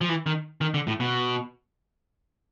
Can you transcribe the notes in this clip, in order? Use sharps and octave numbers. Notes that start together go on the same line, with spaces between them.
F3
E3
D#3
D#3
D3
A2
B2